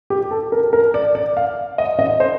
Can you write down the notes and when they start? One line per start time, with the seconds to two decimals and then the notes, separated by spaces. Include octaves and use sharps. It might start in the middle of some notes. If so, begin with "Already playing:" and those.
0.10 G4
0.31 A4
0.52 A#4
0.73 A#4
0.94 D5
1.15 D5
1.37 F5
1.78 D#5
1.99 D#5
2.20 C5